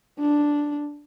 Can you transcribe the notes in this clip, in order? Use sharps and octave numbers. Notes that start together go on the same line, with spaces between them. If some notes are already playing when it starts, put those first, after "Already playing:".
D4